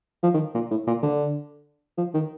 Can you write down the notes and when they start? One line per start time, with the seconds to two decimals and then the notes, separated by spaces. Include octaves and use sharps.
0.23 F3
0.34 D#3
0.54 A#2
0.71 A2
0.87 A#2
1.02 D3
1.98 F3
2.14 D#3